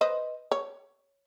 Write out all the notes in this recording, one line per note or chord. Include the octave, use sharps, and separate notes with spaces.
B4 C5 D#5
C#5